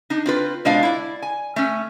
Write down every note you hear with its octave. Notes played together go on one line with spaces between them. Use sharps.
D4 D#4
C4 F4 B4
B2 G#3 C4 D4 F4 F5
E4 D5
G#5
A3 C#4